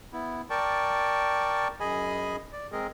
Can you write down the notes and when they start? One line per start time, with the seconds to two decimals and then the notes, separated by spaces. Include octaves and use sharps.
0.13 B3 E4
0.50 A#4 D5 G5 A5 C#6
1.80 F#2 G#4 D#5 G#5 B5
2.53 D5
2.72 G#3 C4 G#4 A#4 D#5